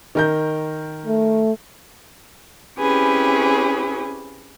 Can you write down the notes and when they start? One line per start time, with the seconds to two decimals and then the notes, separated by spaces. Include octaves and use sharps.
0.15 D#3 A#4 G6
1.06 A3
2.77 C4 C#4 E4 G4 G#4 B4